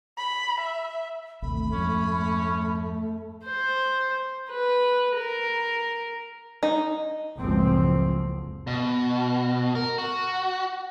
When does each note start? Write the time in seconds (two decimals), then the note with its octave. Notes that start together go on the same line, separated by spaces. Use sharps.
0.18 B5
0.60 E5
1.42 A1 D#2 C3 A3 B5
1.72 F2 G#2 C#4
3.46 C5
4.50 B4
5.17 A#4
6.63 D#4
7.38 F#1 C#2 F#2 A2 F3 C4
8.67 B2
9.75 A#4
9.98 F#4